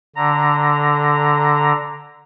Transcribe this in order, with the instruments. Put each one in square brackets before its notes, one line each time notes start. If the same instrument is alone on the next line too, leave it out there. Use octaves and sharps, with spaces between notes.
[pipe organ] D3 A#5